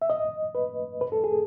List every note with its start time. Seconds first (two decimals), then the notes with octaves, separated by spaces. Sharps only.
0.02 E5
0.10 D#5
0.55 B4
1.01 B4
1.12 A4
1.24 G#4